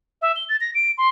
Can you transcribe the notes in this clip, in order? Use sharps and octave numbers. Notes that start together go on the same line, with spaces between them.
E5
G7
A6
A#6
D7
C6